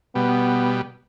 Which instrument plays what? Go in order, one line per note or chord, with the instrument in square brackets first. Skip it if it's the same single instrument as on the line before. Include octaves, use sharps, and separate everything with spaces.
[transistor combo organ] B2 G3 [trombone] B3